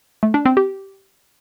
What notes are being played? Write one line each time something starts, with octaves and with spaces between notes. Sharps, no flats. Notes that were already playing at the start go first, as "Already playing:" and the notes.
A3
D4
C4
G4